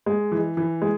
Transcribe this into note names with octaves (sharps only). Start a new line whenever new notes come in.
G#3
E3
E3
G#3